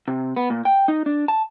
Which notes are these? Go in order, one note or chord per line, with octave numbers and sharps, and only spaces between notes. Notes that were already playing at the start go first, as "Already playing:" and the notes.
C3
B3
A#2
G5
D#4
D4
A5